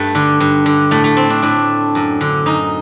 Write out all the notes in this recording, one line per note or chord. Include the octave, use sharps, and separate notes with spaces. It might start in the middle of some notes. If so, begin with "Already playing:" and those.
Already playing: G2 A3
D3
G2
D3
A2 A3
A3
C4
D4
A2 D4
F#2
D3
F#2 D#4